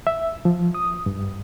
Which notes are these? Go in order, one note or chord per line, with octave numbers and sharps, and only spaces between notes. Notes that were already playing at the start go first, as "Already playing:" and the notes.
E5
F3
D#6
G2